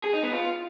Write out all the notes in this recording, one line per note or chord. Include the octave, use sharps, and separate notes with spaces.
G#4
D#4
B3
F4